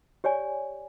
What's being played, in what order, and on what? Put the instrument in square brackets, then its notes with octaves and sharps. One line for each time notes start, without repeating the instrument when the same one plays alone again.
[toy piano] G4 C#5 D5 G#5